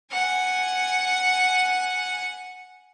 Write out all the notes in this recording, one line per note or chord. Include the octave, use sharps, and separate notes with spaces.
F#5 G#5